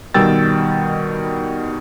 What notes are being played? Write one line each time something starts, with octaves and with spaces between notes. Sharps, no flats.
B2 D#3 G3 G5 E6 A6